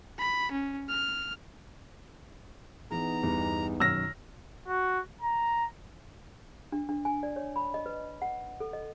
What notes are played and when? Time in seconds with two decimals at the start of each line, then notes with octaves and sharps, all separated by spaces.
0.19 B5
0.52 C#4
0.89 F6
2.91 E3 B3 D#4 G#4 A#5
3.23 E2 G2 E3
3.80 F#2 B2 D#3 E6 F6 A#6
4.68 F#4
5.21 A#5
6.72 D4
6.89 D4
7.05 G#5
7.23 D5
7.36 C#5
7.56 B5
7.74 D#5
7.86 B4
8.22 F#5
8.60 A4
8.73 D#5